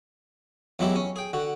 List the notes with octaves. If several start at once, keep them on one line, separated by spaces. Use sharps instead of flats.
E2 F#3 G#3 E4 G4
C#4
G#4 G5
D3 F#4